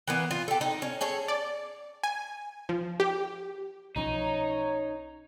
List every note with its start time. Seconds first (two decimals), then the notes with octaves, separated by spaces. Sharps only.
0.08 E3 A#3 B3
0.31 F4
0.48 G4 A4
0.61 D#4
0.82 C#4
1.01 G#4 A4 C#5
1.28 D5
2.04 G#5
2.69 F3
3.00 G4
3.96 B1 F3 C#4 D#4 C#5 A#5